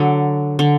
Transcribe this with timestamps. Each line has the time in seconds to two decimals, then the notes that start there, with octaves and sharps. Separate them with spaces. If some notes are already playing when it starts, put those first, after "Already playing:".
Already playing: D3 F#3
0.59 D3